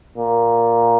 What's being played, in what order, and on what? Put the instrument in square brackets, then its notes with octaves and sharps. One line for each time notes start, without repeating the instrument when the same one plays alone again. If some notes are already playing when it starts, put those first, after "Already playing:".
[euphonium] A#2